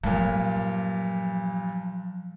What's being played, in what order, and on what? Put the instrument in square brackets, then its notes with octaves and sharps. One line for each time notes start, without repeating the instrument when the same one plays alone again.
[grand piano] G2 A#2 [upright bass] F3 F#3